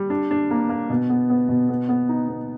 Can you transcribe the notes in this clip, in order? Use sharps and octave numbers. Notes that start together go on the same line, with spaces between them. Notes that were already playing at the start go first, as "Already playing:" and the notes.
Already playing: G3
D4
D4
A#3
A#3
B2
B3
B3
B2
B3
B3
D#4
B3